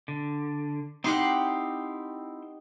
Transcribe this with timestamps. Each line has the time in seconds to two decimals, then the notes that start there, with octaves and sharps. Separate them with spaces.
0.08 D3
1.04 C4 D#4 E4 G4 F#5 C6